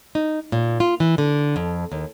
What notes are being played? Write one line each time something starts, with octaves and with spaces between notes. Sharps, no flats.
D#4
A#2
F4
E3
D3
F2
D#2